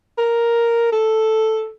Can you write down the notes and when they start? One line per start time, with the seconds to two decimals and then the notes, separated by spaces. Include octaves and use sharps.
0.18 A#4
0.92 A4